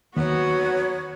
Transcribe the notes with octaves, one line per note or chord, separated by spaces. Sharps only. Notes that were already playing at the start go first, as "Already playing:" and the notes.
D#2 F#3 B3 F#4 C#5